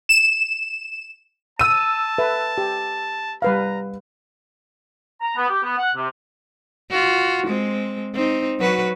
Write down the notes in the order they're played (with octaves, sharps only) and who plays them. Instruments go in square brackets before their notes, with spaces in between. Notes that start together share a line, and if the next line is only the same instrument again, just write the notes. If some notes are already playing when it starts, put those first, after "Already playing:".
[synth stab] E7
[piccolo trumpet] A5 [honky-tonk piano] E6 D#7
[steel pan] A4 B4 E5
G4
[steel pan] G3 B4 F5 [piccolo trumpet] A#5
[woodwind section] A#5
B3
G4
B3
F#5
C3
[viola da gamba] F4 F#4
G#3 C4
C4 D#4
F#3 F#4 B4